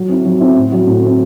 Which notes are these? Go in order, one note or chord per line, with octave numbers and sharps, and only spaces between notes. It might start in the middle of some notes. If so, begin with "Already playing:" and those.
Already playing: F#3
C4 E4
F#3
C4 E4
A2
F#3 C4 F#4
A2
F#3 C4 F#4